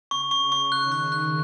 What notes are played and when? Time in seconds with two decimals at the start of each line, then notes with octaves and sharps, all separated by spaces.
0.11 C#3 C#6
0.31 C#6
0.52 C#6
0.72 D#3 F#6
0.92 F#6
1.12 F#6